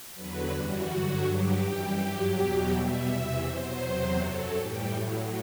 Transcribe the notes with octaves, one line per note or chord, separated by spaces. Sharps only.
E2 D3 F#3 B4
F#2 E3 G3 F#4
G2 D3 F#3
G2 F#3 G4
F#2 E3 G3 G4
G2 F#3
E2 B2 F#3 G4
B2 G3 E5
E2 C3 E3 E5
B2 F#3 C5
E2 C3 F#3
F#2 F#3 A4
A2 E3 G3 G4
A2 F#3